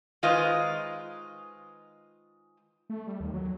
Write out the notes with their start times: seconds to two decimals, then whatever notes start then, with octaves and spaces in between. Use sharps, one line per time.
0.23 D#3 G#3 F4 B4 C5 D#5
2.90 A3
3.07 G3
3.20 D#2
3.34 F#3